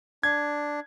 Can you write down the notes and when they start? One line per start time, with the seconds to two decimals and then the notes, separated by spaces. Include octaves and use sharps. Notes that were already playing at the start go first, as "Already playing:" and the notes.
0.23 D4 G#6